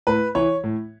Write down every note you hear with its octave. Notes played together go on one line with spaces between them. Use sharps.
A2 B4
E3 C#5
A2